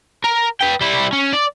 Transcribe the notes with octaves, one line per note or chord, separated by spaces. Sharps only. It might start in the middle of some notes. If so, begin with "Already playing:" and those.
A#4
B4 G5
G3 E4
C#4
D5